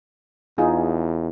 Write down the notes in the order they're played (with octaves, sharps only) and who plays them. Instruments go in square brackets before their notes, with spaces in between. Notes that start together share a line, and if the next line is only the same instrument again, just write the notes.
[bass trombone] E2 [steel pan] D#4 F4 G#4